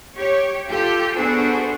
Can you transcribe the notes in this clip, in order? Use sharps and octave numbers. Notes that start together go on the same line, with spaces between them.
G4 C#5
F4 G4 A4
B3 D4 F#4 G#4 A4 C5